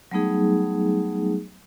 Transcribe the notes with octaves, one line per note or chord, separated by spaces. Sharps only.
F#3 G3 A3 B3 D#4 G#4